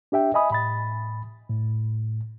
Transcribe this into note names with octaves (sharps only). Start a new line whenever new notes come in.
D4 G4 E5 G5
D#5 E5 G#5 B5 D#6
A2 B5 A6
A2